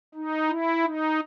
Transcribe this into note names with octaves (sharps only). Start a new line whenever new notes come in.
D#4
E4
D#4